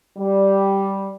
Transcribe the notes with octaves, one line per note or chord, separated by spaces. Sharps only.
G3